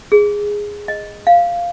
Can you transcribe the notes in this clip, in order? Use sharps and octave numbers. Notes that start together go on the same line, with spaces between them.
G#4
D#5
F5